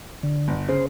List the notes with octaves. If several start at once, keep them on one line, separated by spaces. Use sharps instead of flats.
D3
G1
C#3 C5